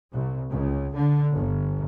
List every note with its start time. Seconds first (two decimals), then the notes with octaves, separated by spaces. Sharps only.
0.12 C2
0.49 C#2
0.92 D3
1.35 G1